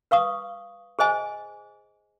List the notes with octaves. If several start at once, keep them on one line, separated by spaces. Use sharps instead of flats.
B4 F5 C#6 D#6
G#4 C5 D#5 G#5